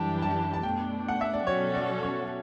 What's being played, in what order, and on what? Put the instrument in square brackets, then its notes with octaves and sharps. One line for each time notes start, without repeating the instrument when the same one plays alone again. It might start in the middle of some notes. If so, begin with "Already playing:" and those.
Already playing: [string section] F#2 E3 G3 D4 G4 [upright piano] A5
[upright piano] A5
A5
[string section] B2 A3 D4 [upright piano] G5
[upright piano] F#5
E5
D5
[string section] B2 F#3 C#4 F#4 A4 [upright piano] C#5
[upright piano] D5
C#5